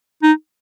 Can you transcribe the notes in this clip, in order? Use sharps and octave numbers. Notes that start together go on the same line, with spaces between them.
D#4